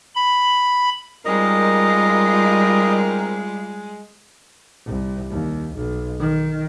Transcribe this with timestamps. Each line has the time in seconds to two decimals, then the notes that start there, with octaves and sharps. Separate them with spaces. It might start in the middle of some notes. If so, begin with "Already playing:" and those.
0.15 B5
1.25 G3 G#3 C4 D#4 F4 A#4 D#5
4.86 C2
5.31 D#2
5.76 B1
6.19 D#3